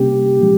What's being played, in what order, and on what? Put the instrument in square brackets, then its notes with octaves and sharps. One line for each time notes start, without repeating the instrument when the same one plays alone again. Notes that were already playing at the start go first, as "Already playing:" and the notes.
Already playing: [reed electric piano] C3 G3 A#3 C#4 [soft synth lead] G4
[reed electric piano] A#2 F3 G#3